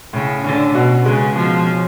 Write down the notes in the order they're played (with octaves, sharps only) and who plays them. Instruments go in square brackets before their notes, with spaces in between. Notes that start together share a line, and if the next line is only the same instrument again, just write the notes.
[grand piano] A2 [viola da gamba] C#3
[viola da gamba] D3 [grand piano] C#4
[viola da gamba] B2 [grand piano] F#4
[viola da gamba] C#3 [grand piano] G#3
[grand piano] B2 [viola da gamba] F3
[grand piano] C#4